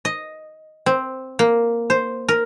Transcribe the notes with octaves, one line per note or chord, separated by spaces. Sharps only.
D#5
C4
A#3
C5
A#4